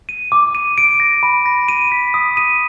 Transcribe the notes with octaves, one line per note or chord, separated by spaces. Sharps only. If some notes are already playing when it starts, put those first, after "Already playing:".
D#7
D6
D#7
D7
A#6
B5
A#6
D#7
B6
D#6
D#7